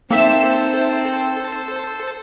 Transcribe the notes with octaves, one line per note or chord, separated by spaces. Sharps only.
A#3 C4 D#4 A4 C5 E5 E7